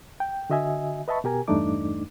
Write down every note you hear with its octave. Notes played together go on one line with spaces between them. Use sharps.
G5
D3 F#4 D#5 E5 G#5
B4 D#5 E5 A5 B5 C#6
B2 G4 A#4 G#5
E2 G2 A3 D4 D#4 D6